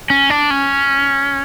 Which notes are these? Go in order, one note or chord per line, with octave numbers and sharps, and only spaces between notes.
C#4
D4
C#4